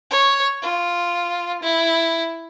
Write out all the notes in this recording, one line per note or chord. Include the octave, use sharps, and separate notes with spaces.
C#5
F4
E4